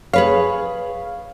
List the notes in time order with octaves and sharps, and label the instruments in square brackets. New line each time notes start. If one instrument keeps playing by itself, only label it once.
[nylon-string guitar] G#4 B4 C#5 [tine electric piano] F5